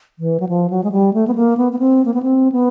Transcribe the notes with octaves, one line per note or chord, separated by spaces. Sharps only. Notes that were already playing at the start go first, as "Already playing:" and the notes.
E3
F#3
F3
F#3
G#3
G3
A3
B3
A#3
B3
B3
C4
A#3
B3
C4
B3